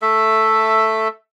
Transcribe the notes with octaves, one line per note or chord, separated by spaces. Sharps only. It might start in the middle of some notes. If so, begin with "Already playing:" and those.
A3 A4 E5